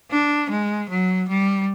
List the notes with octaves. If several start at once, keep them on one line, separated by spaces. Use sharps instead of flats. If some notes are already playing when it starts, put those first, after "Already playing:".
D4
G#3
F#3
G3